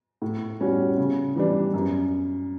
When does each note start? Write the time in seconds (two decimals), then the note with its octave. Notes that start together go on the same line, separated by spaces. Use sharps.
0.22 A2
0.60 G3 C#4 F#4
0.98 C#3
1.36 E3 G3 D4
1.74 F#2